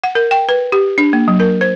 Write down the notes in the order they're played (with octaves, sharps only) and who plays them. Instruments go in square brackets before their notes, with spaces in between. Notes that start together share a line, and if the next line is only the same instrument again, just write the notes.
[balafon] F#5
A#4
G5
B4
G4
D4
A#3
F#3
A#4
C5